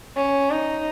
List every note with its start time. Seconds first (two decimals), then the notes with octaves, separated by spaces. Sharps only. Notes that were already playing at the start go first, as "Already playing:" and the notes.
0.17 C#4
0.51 D#4